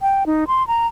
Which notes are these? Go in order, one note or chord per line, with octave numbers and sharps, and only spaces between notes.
G5
D#4
C6
A#5